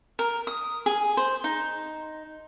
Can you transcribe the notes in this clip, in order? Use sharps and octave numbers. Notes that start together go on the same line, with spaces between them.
A#4
D#6
G#4
C5
D#4